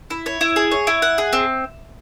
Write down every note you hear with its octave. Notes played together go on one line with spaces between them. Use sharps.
E4
C#5
E4
G#4
C#5
E4
F#5
G#4
C4